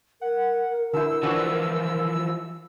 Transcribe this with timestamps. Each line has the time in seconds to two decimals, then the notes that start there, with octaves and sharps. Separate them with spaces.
0.21 A#4 F#5
0.93 D3 E4 E6
1.23 D3 E3 F3 D4 F#4